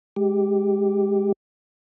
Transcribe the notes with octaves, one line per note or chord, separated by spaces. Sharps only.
G#3 G4